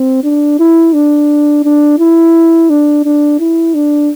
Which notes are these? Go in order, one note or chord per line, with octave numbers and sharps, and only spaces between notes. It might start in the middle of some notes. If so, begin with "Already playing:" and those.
Already playing: C4
D4
E4
D4
D4
E4
D4
D4
E4
D4